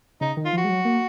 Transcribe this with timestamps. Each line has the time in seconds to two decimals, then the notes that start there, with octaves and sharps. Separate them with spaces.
0.21 C#3 D#4
0.37 D#3
0.45 F4
0.53 F3 F#4
0.64 G#3
0.69 F#3
0.85 A#3